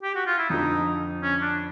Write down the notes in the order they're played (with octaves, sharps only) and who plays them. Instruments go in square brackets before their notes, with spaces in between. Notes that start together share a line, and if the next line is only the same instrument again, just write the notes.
[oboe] G4
F#4
F4
E4
[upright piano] F2 D3 F3 [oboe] D#4
[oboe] C#4
D4